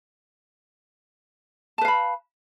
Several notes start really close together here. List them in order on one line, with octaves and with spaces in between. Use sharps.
A5 B4 F5 B5